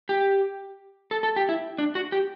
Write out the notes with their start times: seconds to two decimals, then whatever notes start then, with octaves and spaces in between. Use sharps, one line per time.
0.09 G4
1.11 A4
1.23 A4
1.36 G4
1.49 E4
1.78 D4
1.95 F#4
2.12 G4